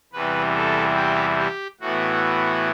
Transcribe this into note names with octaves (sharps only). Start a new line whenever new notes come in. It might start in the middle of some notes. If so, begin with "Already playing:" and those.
E2 C3 E3 G3 B4
A4
G4
G4
A2 E3 B3 F#4